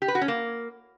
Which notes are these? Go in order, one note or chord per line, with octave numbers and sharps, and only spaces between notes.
G4
B4
F#4
C#4
A#3